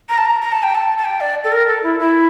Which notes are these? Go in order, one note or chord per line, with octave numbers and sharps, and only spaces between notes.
A#5
A5
A#5
A#5
A5
G5
A5
A5
G5
D5
A4
A#4
A4
E4
E4